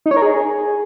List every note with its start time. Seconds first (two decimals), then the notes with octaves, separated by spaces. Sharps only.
0.06 D#4
0.11 C#5
0.17 A#4
0.22 G#4